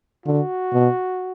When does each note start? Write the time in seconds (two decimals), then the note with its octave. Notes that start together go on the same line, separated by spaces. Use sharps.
0.26 D3 F#4
0.73 B2